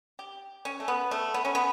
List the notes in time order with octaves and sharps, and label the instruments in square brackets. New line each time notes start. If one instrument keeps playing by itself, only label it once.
[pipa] G4
C#4
A3
B3
A3
B3
C#4
B3